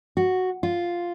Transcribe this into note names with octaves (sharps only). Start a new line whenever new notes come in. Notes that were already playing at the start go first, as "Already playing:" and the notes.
F#4
F4